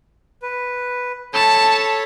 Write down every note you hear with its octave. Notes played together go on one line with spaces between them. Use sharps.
B4
A4 C#5 A5 B5